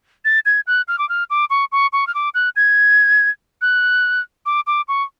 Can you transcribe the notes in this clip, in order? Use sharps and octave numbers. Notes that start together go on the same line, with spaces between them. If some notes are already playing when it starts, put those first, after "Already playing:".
A6
G#6
F#6
F6
D6
F6
D6
C#6
C#6
C#6
F6
D6
F#6
G#6
F#6
D6
D6
C#6